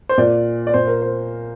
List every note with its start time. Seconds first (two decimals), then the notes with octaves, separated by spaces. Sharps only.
0.09 C5
0.18 A#2 D5
0.67 D5
0.74 A#2 C5
0.87 A#4
1.02 C5